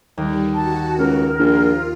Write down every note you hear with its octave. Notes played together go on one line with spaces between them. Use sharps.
D#2 G3
F#4 A5
C#2 A#4
A#1 F4